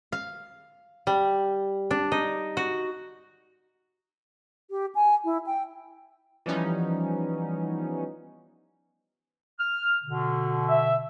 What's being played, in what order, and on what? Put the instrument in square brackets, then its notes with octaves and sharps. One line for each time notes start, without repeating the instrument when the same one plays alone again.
[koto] F5
G3
D4
D#4
F#4
[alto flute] G4
G#5
E4
G5
[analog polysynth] E3 F3 G3 B3 C#4 D#4
[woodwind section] F6
B2 D3
[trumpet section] E5